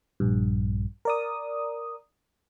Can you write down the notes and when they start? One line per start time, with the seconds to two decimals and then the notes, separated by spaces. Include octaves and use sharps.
0.20 A#1 G2
1.05 A#4 D5 D#6